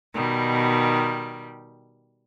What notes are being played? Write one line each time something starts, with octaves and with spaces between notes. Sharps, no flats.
B2 D#3 G3